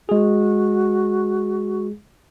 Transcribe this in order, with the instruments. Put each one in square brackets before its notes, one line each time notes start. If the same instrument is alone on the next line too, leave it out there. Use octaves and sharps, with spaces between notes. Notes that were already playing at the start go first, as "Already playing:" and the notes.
[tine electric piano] G#3 G#4 [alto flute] F#4